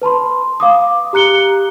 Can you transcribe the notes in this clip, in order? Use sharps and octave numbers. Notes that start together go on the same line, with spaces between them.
B4 A5 B5 C6
F5 D6 D#6
G4 A#5 F#6 C#7 G7